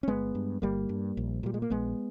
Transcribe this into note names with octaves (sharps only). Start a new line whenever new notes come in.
C#4
G1 G#3 B3
G2
G1 G3 A#3
G2
A#1
A#2 G3
G#3
A#3
A#1 G#3 B3